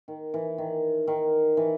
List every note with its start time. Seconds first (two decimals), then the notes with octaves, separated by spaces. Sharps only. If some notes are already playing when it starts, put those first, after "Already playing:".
0.08 D#3
0.34 E3
0.58 D#3
1.07 D#3
1.57 E3